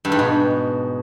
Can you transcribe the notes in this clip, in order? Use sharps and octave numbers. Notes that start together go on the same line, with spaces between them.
G2
G#2
B2